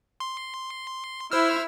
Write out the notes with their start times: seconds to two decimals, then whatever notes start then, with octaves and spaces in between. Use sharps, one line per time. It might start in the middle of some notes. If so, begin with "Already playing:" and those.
0.20 C6
1.32 E4 C5 E6 F6